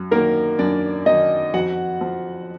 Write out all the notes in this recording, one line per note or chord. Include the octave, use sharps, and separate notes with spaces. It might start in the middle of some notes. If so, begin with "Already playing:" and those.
Already playing: F#2
D#3 F#3 A#3 A#4
F#2 D4 D5
D#3 F#3 D#4 D#5
F2 F#4 F#5
F3